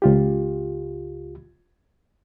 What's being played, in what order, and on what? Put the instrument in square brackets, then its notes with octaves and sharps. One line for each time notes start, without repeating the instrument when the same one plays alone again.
[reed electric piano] C#2 F4 G4